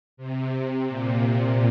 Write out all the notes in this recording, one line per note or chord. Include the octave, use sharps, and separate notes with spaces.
C3
A#2